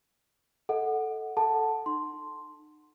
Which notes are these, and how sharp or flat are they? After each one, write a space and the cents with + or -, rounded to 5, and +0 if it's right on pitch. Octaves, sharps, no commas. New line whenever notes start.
A4 +0 D#5 +40 F#5 +0
A4 +0 F#5 +0 A5 +0
D#4 -35 C6 +0